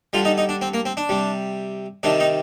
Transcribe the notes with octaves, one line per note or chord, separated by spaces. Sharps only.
D3 G3 F4
D#4
D#4
D4
C4
A#3
C4
D4
C3 G3
C3 D#3 G3 D4
D#4